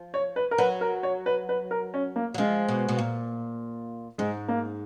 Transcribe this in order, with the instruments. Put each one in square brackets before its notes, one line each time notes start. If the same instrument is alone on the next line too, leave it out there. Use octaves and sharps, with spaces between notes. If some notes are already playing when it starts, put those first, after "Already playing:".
Already playing: [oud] F3
[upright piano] C#5
B4
A#4
[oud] F#3 [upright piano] B4
[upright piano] A#4
C#5
B4
B4
A#4
C#4
A#3
[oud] F#3
[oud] F3 [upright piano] G#3
[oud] B2
B2
A#2
[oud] G#2 [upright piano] G#3
[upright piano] A#3